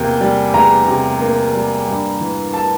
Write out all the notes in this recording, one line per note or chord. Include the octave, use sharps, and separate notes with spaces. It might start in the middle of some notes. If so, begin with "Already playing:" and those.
Already playing: E2 C3 A#3 G5
G3
E2 A#5
C3
A#3
G3
G2
E3
A5